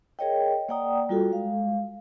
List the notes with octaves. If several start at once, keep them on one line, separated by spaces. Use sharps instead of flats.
G#4 A#4 C#5 D#5 G5
A#3 D5 F#5 G5 A#5 D#6
G3 F4 F#4 A4
G#3 F5